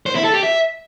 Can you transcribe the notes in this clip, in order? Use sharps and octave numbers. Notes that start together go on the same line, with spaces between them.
C5
E4
A4
G4
E5